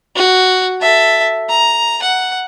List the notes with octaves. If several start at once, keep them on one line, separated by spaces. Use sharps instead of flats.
F#4
A4 E5
A#5
F#5